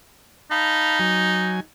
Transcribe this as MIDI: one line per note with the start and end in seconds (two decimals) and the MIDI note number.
0.51 1.62 63
0.51 0.99 77
0.51 0.99 81
0.51 0.99 83
1.00 1.60 54
1.00 1.60 80